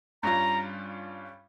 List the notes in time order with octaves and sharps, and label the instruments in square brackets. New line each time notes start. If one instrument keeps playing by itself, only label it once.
[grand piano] G2 G3 C#4 F4 [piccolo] A#5